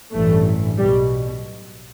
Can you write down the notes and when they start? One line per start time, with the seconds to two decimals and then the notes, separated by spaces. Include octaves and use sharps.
0.12 A1 G2 E3 A3
0.78 B1 B2 G3